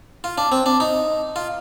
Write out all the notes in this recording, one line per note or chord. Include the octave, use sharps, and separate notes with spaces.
F4
D4
C4
D4
D#4
F4